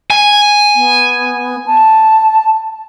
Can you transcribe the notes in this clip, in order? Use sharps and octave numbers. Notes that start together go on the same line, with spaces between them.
G#5
B3
A5